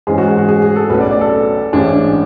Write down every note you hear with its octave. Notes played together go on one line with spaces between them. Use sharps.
G#2 E3 G#3 C#4 G#4
F#4
G#4
F#4
G#4
G#4
A4
B1 A2 F#3 C#4 B4
D5
D5
A4
A1 G#2 G#3 C#4 D4